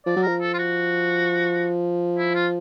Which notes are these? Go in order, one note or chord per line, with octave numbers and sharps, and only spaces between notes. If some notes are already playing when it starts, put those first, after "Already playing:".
F3 D5
F#3
F3 A#4
A4
F4
F#4
E4
F4